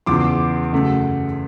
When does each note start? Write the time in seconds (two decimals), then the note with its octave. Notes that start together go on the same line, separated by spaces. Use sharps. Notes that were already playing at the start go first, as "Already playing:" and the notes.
0.06 E2 C#3 F3 C6 D6
0.73 F#2 C#3 F#3 A3